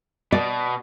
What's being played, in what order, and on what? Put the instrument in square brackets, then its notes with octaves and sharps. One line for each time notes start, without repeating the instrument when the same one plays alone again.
[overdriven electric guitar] B2 [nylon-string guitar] D5